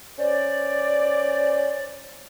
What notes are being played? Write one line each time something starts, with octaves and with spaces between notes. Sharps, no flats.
C#4 C5 D5